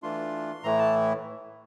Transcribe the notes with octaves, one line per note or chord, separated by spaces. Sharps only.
E3 A3 D4 F4 C6
A2 E3 A3 E4 A#5
A5